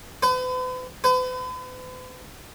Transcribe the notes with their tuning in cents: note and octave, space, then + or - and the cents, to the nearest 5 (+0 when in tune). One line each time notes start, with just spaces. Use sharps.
B4 +45
B4 +45